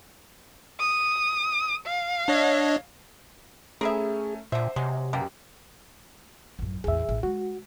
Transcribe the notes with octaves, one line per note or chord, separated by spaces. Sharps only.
D#6
F5
D4 C#5 D#5
A3 C#4 G#4 A#4 B4 E5
A#2 D3 C5 E5
C3 F#3 G#3
F#2 B2 A#3 G4 G5
A1 F#2
A1 E2 G#4 E5
A1
G#3 F#4